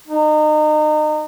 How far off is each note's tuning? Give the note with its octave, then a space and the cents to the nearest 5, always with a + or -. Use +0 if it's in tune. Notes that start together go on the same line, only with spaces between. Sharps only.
D#4 -30